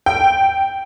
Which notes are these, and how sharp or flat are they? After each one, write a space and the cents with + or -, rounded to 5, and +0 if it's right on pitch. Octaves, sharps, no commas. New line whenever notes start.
G5 -5